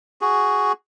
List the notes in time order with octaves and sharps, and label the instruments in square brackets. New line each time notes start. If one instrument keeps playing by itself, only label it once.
[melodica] F#4 G#4